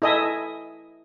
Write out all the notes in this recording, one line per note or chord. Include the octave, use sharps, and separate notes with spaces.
E4 A4 D#5 E5 G#5